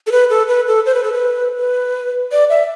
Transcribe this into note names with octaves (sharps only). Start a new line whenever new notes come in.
A4
B4
A4
B4
A4
C5
B4
A4
B4
B4
D5
E5